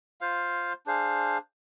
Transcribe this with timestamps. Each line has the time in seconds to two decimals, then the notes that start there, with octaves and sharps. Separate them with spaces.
0.21 F4 C5 F5
0.86 D4 G#4 C5 F5